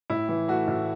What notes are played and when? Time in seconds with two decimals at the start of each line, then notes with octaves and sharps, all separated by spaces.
0.10 A2 E4
0.29 E3
0.48 A3 F#4
0.68 A2